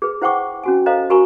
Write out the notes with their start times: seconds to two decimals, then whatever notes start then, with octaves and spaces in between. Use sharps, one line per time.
0.02 G#4 B4
0.22 E4 C5 F#5 G5 C#6 D6
0.64 C#4 F#4 G#5
0.86 A4 C5 D#5 F5 A#5
1.10 F#4 A#4 G#5 A#5 B5 C#6